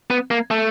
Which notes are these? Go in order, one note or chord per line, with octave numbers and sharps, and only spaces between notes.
B3
A#3
A3